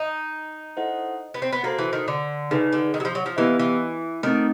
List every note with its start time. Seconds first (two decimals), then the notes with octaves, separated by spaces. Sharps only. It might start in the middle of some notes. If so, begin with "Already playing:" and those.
Already playing: D#4
0.77 E4 A4 C5 D#5 F#5
1.34 B3
1.42 C4
1.53 B3
1.63 A#3 F#4 A4 C5
1.79 E3
1.93 D#3
2.08 D3
2.51 C#3 D#4 G#4 B4 D5
2.73 D3
2.94 D#3
3.00 F#3
3.05 F3
3.15 F#3
3.26 F3
3.37 E3 B3 E4 G4 B4 D#5
3.59 E3
4.23 D#3 A3 C4 D#4